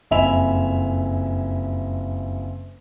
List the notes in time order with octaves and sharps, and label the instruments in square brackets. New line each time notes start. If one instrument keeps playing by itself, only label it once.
[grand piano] F#1 F2 E5 G#5 B5 F7